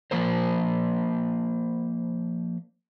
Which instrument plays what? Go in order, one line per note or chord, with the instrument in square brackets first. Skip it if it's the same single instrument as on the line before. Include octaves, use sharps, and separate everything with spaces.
[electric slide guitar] F3 A#3 A#4 C5